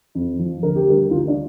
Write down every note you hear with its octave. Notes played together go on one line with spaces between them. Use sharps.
F2
F3
D2 A#4
G4
D3 G3 A#4
D2 F4
D4